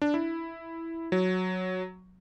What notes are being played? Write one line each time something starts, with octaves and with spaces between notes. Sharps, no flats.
D4
E4
F#3